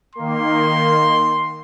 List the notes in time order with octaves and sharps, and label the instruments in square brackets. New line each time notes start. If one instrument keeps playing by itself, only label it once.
[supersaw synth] D#3 A#3 [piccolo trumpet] C6